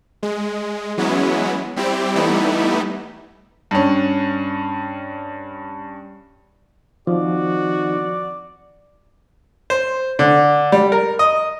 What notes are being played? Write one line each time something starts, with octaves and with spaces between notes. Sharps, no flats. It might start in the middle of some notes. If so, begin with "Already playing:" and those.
G#3
E3 F#3 G#3 B3 C#4 E4
G3 C4 E4 G4
E3 G3 A3 B3 D#4 E4
G2 C#4
D#3 F3 C4 D#4 F#4 D5
C5
D3
G3
A#4
D#5